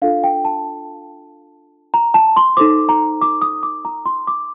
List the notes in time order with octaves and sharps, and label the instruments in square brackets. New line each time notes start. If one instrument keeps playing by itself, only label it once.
[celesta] D4 F4 A4 F5
G5
A5
A#5
A5
C6
D#4 A4 C5 D6
A#5
D6
D#6
D6
A#5
C6
D6